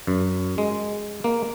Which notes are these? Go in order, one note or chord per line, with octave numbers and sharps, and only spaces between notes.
F#2
G#3
A#3